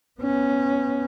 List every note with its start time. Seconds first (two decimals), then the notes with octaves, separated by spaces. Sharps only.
0.21 B3 C#4